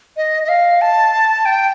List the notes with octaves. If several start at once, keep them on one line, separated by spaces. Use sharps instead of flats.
D#5
D#5
F5
A5
G5